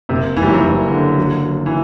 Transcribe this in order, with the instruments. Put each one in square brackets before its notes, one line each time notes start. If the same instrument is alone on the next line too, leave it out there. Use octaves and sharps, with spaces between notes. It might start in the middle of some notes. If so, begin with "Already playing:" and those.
[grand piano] F#1 [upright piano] C3
[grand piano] F#1 [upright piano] E3
[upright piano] G3
F#3
[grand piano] F#1 [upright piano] E3
[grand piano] D3
F#3
F#3
[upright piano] E3